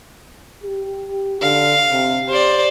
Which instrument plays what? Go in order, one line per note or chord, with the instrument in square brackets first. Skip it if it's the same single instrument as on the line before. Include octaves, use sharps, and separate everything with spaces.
[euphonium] G4
[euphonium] D3 [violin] F5
[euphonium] C3
[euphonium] G4 [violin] C5 D5